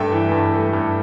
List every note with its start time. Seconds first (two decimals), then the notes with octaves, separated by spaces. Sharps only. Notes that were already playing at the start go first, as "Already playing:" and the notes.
Already playing: G2 A3 E5 G5
0.12 E3
0.31 G2
0.53 A3
0.73 G2